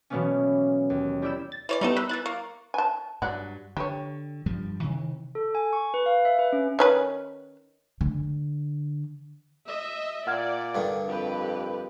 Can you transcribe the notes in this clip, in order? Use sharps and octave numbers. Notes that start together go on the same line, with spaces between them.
B2 E3 F#3 A#3 B3 C#4
D#2
G3 E4 G4 E6 G6 E7
A6
E3 C#5 D5
G3 A3 B3 D#4 A4
D#3 B5 E6 F#6
E3 E4 F#6 A6
A#3 C#6
G#5 A5
G2 F#3 D5 F#5
D3 G4 C#5
G2 F3 G3
C3 D#3 E3
A4
G#5
C#6
B4
F5
E5
B4
C#4
D#3 C#4 B4
D3
D#5 E5
A#2 D5 F#5 F6 G#6
G2 D3 D#3
F2 G4 B4